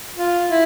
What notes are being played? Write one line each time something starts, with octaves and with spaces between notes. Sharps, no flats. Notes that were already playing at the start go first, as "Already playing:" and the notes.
F4
E4